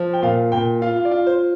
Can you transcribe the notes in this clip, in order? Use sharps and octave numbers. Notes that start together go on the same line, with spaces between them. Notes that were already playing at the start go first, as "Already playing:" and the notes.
Already playing: F3
G5
A#2 F5
A#2 G5
F4 F5
F5
D5
F4
C5